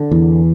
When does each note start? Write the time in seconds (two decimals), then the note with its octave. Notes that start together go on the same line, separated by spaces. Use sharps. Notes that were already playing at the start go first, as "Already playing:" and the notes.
Already playing: D3
0.11 E2